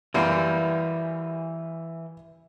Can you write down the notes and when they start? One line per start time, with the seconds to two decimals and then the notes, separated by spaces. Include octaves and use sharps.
0.14 F#2 E3 G3 A#3